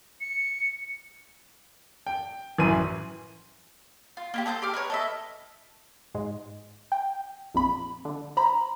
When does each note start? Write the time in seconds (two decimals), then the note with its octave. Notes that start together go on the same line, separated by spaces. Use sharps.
0.21 C#7
2.06 G5
2.58 A1 F#2 E3 G#5 C6 D#7
4.17 F4
4.34 A#3 E4 G4
4.46 A4 C5 D#6 G6
4.62 G4 D6 F6
4.74 A#4 B4 C#5
4.90 A4 D#5 E5
6.15 G#2 G#3
6.92 G5
7.54 A#1 F2 B5
8.05 D3
8.37 C5 A#5 B5